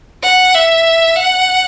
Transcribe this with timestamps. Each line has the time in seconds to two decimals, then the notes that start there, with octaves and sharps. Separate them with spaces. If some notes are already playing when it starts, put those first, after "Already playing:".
0.23 F#5
0.54 E5
1.16 F#5